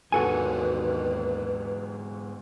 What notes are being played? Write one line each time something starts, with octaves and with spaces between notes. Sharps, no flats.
D#2 G#2 D3 F#4 A4 B4 G#5